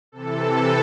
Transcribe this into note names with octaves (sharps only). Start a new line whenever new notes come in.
C3 E3 A4